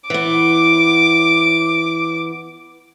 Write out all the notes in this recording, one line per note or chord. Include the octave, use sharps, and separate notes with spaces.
E3 B3 D6